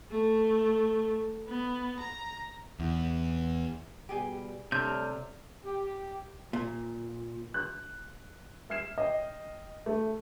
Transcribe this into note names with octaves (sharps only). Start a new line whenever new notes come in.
A3
B3
A#5
E2
B2 G3 G4 G#4 G#5
C3 G3 A3 D4 C#5 F6 G6
G4
A#2
F#6
E5 F6 G#6 C7 E7
D#5 G5
A3